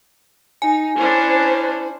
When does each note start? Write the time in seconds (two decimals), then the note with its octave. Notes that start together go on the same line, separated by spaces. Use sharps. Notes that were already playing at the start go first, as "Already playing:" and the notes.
0.62 D#4 G#5
0.98 C#4 D4 E4 C5